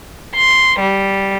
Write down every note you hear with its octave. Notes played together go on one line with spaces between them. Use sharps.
C6
G3